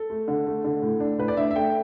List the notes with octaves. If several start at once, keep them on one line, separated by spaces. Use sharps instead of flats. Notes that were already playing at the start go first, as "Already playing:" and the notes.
Already playing: A4
A3
D3
A3
D3
A2
D4
A2 B4
D5
D4 E5
E5
A3 G5